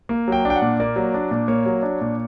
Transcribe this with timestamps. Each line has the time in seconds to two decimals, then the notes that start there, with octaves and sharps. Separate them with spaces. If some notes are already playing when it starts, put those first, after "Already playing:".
0.09 A#3
0.28 F#3 G5
0.45 D4
0.50 G5
0.56 F#5
0.62 A#2
0.80 A#3 D5
0.96 F#3
1.14 D4
1.31 A#2
1.48 A#3 C#5
1.66 F#3
1.83 D4
2.01 A#2